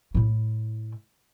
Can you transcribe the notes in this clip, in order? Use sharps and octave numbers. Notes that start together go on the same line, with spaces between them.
A2 E4